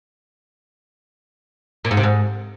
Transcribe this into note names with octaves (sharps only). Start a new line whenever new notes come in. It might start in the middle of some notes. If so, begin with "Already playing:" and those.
A#2
G#2
C3
G#2